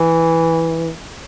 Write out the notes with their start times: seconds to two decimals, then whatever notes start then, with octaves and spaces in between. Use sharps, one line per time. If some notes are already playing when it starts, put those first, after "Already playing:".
Already playing: E3